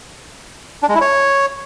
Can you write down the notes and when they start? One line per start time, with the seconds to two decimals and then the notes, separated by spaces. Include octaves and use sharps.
0.83 D4
0.89 G#3
0.95 E4
1.01 C#5